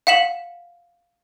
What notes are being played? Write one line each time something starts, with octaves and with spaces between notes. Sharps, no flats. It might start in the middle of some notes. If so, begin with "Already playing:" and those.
F5 F#5 B6 E7 F#7